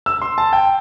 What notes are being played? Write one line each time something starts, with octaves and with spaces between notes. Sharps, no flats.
E6
C6
A5
G5